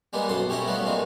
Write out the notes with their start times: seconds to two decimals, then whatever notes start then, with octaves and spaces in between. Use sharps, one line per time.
0.13 G3 G#3 A#3 B3 D#4
0.28 B1 F#2 A4 C6 D#6
0.49 G3 C#4 E4 G4 D#5 E5
0.67 F#3 G3 A3 B3 F4
0.86 A#2 G#3 C4 D#4